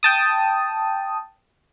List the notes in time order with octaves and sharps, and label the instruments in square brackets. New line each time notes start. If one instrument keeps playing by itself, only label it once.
[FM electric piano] G5 A5 D#6